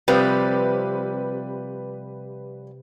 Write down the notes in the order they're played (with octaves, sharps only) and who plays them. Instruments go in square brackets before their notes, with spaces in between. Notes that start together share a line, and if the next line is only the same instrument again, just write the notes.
[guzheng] C3 [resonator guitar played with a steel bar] F3 G3 [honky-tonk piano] B4